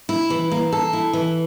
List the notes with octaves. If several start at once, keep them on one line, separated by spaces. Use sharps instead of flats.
E4
E3
A#3
A4
E4
E3